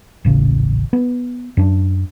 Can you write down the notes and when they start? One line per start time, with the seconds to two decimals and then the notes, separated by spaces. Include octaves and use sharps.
0.25 D#1 A1 C#3
0.93 B3
1.57 F#2 D4